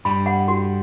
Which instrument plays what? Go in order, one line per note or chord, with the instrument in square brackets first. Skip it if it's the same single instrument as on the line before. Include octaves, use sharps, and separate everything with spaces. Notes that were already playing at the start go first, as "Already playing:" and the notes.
[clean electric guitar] G2 G3 [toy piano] B5
[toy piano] F#5
F#4